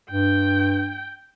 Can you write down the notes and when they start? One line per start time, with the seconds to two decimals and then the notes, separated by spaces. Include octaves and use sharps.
0.11 G2 G5